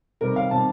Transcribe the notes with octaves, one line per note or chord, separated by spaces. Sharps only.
C3 D#3 G3 A#4
F5
C3 D#3 G3 A5